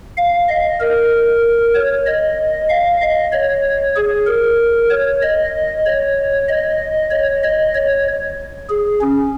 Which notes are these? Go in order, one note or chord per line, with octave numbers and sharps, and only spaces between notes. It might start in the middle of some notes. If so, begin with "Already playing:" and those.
F5
D#5
A#4
C#5
D#5
F5
D#5
C#5
G#4
A#4
C#5
D#5
C#5
D#5
C#5
D#5
C#5
G#4
C#4